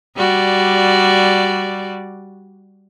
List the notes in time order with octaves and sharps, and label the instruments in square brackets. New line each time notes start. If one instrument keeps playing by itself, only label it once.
[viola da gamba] G3 F#4 D5